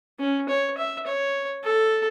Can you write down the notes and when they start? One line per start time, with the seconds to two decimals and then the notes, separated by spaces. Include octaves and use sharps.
0.19 C#4
0.49 C#5
0.78 E5
1.07 C#5
1.64 A4